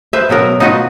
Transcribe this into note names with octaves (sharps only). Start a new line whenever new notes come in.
B4 C5 E5
B2 F#3 B3 A#4
D#4 F4 F#4 B4 D#5